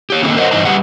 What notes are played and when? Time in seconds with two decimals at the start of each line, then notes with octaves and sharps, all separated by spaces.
0.10 G4 C#5
0.22 D3 D#3 A#3 C4 G#4 A4
0.37 A#4 C5 C#5 D#5 F#5
0.51 G2 E3 D#4 C5 D#5 A5
0.65 G3 G4 G#4 B4 F#5